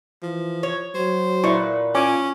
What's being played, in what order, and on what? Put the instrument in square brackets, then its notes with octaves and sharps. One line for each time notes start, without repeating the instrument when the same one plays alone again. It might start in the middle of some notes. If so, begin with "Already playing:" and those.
[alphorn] E3 [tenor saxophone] F3
[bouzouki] C#5
[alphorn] F#3 [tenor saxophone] C5
[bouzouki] A#2 B4 [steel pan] E4 C#6
[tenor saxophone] C#4 [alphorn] F4 [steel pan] G#5 D6